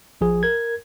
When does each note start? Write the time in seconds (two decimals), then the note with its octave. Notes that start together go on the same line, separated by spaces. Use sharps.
0.21 A#1 F3 G#4
0.43 A#4 G#6